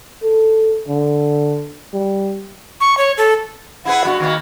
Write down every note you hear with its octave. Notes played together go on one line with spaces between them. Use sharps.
A4
D3
G3
C#6
C#5
A4
E4 G#4 B4 F#5
G2 B3 F#4
D#3 A#3 B3